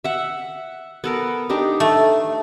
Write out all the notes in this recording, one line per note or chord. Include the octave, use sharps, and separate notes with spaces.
E5 F#5
B3 A4 A#4
D4 D#4 G4
A3